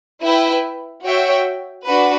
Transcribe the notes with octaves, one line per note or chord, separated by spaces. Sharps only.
E4 B4 E5 G5
F#4 C#5 E5 G5
D4 F#4 B4